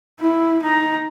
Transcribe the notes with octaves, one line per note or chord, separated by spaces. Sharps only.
E4
D#4 A#5